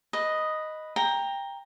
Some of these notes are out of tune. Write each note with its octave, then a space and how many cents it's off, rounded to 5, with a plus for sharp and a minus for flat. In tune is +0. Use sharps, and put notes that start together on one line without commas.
B4 +0 D#5 +0
G5 +20 A#5 +0